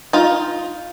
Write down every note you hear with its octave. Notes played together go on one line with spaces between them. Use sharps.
D#4 F4